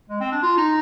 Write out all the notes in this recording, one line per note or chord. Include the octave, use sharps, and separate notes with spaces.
G#3
C4
D4
F4
D#4